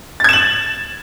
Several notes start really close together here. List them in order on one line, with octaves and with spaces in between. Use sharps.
A6 G#6 E7 F#7